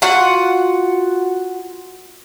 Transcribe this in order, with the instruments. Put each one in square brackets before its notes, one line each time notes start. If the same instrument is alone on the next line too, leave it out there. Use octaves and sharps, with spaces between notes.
[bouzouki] F4 F#4 F#5